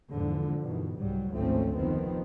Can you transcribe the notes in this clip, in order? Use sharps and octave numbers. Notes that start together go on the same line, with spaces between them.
E2 G#2 D3 F3
G2 B2 D#3 E3
C2 G#2 F#3 G3
G#1 D2 F3 A3 C4 C#4
F1 D#3 F3 B3 C4